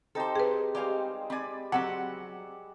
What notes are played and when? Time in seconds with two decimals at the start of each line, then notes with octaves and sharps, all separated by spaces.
0.15 C4 D#4 G4 A4 C5
0.36 G#4 B4
0.75 G3 G#3 C4 G4 C#5 F5
1.30 C4 D5 G#5 B5
1.72 F#3 C4 G4 F#5